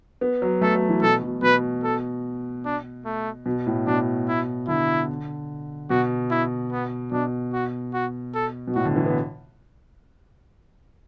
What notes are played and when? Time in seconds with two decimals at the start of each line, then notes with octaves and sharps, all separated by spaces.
0.21 B3
0.42 F#3
0.61 A3 A4
0.75 F#3
0.89 E3
1.02 B2 A4
1.23 B2
1.42 B2 B4
1.83 A4
2.65 D4
3.05 A3
3.46 B2
3.67 A2
3.87 B2 D4
4.28 E4
4.68 D3 E4
5.90 B2 F#4
6.31 E4
6.72 B3
7.12 B2 D4
7.53 F#4
7.94 F#4
8.34 A4
8.67 B2
8.75 A2 F#4
8.85 D3
8.96 E3
9.06 B3